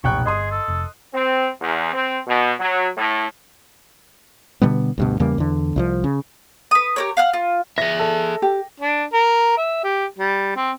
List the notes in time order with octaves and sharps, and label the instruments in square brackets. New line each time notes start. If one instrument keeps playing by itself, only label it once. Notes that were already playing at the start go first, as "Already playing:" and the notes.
[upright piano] F1 G5 F#6 [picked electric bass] B1 A#2 [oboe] C#6
[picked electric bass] G1 [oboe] G#4 [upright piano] D#5 C6 D#6
[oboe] A4
[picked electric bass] F1
[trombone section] C4
E2
C4
B2
F#3
A2
[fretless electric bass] B2 D3 G3 B3
D2 G2 B2
E2 C#3 G3 A#3
E2 D3
C2 E3 F3
C#3
[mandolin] B4 D#6
G4 A#4 C#5
F5 F#5 F6
F4
[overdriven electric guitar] G#4 E5 [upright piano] A#6
[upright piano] A4
[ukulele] G4
[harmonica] D4
A#4
E5
G4
G3
C4